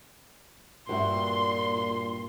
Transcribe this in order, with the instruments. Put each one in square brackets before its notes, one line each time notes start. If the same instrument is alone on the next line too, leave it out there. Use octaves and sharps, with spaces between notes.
[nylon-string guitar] G2 F#4 E5 [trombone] A#2 [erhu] C6